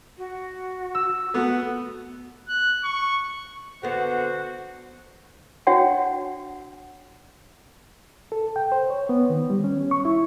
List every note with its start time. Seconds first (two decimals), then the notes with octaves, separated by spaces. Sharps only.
0.18 F#4
0.95 E6
1.34 A3 B3 F#4
2.48 F#6
2.84 C#6
3.83 D3 B3 F#4 C5
5.67 D4 F#4 C#5 E5 F#5 G5
8.32 A4
8.56 G5
8.72 C5
8.90 C#5
9.09 B3
9.30 D#3
9.50 G3
9.64 C#4
9.91 C#6
10.05 E4